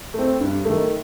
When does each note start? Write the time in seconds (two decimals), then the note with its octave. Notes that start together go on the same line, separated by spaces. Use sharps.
0.14 A3 C4
0.40 G2
0.65 D#3 A3